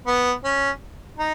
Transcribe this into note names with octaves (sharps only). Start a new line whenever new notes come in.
B3
C#4
D#4